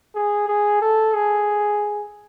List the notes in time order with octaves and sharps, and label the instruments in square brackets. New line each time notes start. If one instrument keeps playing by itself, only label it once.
[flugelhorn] G#4
G#4
A4
G#4